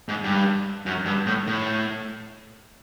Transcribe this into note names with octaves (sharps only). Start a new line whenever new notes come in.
G#2
G2
F#2
G2
A2
A2